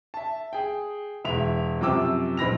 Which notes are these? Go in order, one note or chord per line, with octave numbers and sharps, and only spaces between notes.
E5 A5
G#4 G5
E1 E5 F7
F#2 C3 F3 G5 D6 E6
A#1 B5 A#6 F7